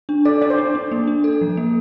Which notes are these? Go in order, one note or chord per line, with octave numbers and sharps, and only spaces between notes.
D4
A4 D5
D4 D5
C5
D4
D4
A#3
D4
A4
F3
A#3